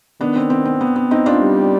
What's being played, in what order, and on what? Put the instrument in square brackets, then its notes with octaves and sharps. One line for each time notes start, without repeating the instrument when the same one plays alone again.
[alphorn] D#3 [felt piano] B3 D4
[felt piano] C4
C4
C4
B3
B3
C4 D#4
D4 F4
[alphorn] G3